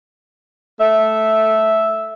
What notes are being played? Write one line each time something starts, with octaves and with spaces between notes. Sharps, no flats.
A3 E5